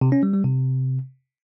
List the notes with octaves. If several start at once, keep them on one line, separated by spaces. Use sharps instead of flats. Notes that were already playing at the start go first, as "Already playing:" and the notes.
C3
C#4
G3
G3
C3